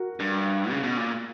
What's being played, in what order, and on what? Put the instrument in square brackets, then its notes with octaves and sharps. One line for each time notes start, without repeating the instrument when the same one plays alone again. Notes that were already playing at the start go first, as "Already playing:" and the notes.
Already playing: [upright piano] F#4 A#4
[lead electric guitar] G2
C#3
B2
A#2